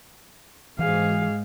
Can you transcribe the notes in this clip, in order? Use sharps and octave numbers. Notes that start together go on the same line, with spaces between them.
G#2 E3 G#4 F5